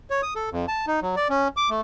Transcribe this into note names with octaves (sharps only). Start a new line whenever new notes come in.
C#5
D#6
A4
F2
A5
D#4
F#3
D5
C#4
D6
A3